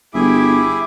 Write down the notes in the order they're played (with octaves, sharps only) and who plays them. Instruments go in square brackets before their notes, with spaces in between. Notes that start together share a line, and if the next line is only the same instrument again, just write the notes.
[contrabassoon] G1 [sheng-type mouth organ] E4 G#4 E5 [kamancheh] G4 D6